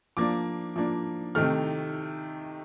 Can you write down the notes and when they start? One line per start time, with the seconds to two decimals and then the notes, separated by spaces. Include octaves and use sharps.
0.17 F3 A#3 D4 D6
0.76 F3 A#3 D4
1.35 C3 D#3 A3 F6